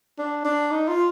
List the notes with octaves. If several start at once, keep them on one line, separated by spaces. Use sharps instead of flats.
D4
D4
D#4
F4